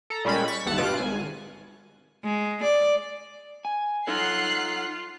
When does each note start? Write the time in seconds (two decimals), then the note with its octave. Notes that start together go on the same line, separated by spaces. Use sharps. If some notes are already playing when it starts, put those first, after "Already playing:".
0.10 A4 A#5
0.25 A#2 G3 G#3 C#4 B5
0.48 C#6 A6 B6
0.66 G1 D#2 A4 F#5 A5
0.78 G2 B2 F4 F5 F#6 D7
0.97 G#1 G#5
2.24 G#3
2.63 D5
3.65 G#5
4.07 D#4 F4 A4 C#5 F#5 F#6 C7